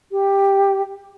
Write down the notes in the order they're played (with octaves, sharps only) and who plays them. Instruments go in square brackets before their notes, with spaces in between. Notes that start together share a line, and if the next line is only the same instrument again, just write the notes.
[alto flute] G4